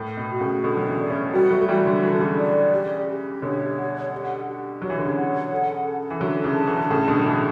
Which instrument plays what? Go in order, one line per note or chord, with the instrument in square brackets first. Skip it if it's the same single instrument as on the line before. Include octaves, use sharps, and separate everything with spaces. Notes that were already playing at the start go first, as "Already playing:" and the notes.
Already playing: [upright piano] A2
B2
[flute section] F#4
[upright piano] A2 C#3
[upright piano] B2 D3 [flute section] A4
[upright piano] F#3
C#3 E3
[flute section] D5
[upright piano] A3 C#4
[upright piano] G3 B3 [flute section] F#4
[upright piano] F#3 A3
A3
[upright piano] E3 G3 [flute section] F#4
[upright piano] D3 F#3
[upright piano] E3 [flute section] A4
[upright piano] D3
C#3 E3
[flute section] D5
G4
G4
[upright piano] B2 D3 [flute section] C#5
[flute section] F#5
G4
G4
[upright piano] F#3 [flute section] C#5
[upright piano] E3
D3
C#3 E3
[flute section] F#5
A4
A4
[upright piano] E3
[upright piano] D3 F#3 [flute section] E5
[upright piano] C#3 E3
[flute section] A5
[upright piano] E3
D3
[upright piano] A2 C#3 [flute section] A4
[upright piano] B2 D3
F#3
[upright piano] C#3 E3 [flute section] A4